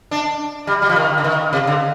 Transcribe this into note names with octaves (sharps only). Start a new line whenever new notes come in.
D4
G3
G3
F3
D#3
D3
D#3
C3
D3